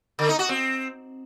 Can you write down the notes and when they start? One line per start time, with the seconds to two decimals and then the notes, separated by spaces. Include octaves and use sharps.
0.19 D3
0.29 D#4
0.39 F#4
0.49 C4